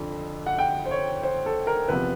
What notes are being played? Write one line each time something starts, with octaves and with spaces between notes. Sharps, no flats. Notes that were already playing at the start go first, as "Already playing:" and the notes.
Already playing: F2 D3 F3
F#5
G5
C5
C#5
C5
A4
A#4
E2 C3 F3 B4